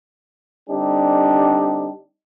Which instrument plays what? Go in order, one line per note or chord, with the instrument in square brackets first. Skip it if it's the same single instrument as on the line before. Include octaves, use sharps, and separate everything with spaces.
[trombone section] D3 G3 C4 D4 D#4 G4